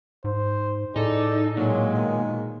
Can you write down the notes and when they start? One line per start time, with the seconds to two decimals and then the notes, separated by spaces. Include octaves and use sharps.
0.24 G#2 C5
0.96 A2 A3 D#4 G#4 A4 D5
1.57 A#2 F#3 G#3
1.93 B2 D#3